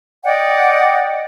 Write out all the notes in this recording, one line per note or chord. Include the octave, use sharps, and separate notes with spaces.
D5 D#5 F#5 G5